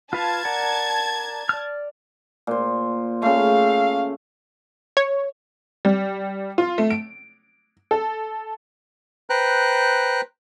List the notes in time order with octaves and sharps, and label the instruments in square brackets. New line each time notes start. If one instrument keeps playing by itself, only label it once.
[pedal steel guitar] F4 B4 F5 [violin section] A5 G#6
[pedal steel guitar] A#4 D5 F#5
D5 F6
[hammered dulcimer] A#2 C5
[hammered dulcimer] C#3 A3 [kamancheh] F5
[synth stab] C#5
[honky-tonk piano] G3
F4
A3
D7
A4
[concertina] B4 C5 G5 A#5 F#6